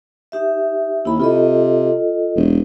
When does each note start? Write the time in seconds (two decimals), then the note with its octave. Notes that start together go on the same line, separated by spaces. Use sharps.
0.32 D#4 G4 E5
1.05 D#2 E4 B5
1.20 C3 F4 A4 D#5
2.36 E1